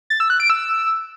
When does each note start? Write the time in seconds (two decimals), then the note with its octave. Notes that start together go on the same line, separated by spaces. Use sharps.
0.10 A6
0.20 E6
0.30 F#6
0.40 D7
0.50 E6